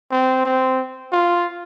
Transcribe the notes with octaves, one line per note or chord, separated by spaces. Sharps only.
C4
C4
F4